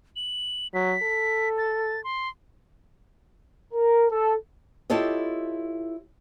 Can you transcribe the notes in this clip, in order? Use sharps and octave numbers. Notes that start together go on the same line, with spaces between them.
F#7
F#3 B6
A4
A6
C6
A#4
A4
E4 F4 G4 A4 C#5 D#5